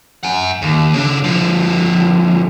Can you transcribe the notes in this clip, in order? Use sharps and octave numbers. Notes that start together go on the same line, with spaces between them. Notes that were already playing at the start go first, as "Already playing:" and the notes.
F#5 G#5
D#2
C#3 D4
D3 F3